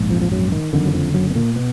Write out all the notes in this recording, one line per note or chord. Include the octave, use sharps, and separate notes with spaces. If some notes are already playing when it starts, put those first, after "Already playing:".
Already playing: A#1 G#2
F2 F3
F3
F#2 F#3
D#3
F#1 F2 D3 D#3
F#3
F2 F3
F#2 F#3
B3
A#2 A#3
B2 B3